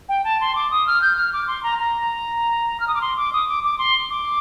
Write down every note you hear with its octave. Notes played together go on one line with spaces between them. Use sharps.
G5
A5
C6
D6
D#6
F6
G6
F6
D6
C6
A#5
A#5
F6
D#6
D6
C6
D6
D#6
D6
D6
C6
D6